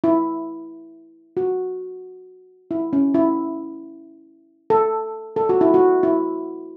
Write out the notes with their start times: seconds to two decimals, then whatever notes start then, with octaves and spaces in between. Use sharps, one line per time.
0.04 E4
1.37 F#4
2.71 E4
2.93 C#4
3.14 E4
4.70 A4
5.36 A4
5.49 F#4
5.61 E4
5.74 F#4
6.03 E4